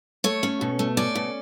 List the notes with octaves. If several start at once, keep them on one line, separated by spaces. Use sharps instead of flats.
A3 C#5
C#4
B2
A3
C#4 D5
B2